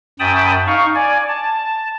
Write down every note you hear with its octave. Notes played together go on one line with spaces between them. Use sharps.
F#2 G5 A5 B5 D#6
D#4 F5 C#6
D5 G#5
A5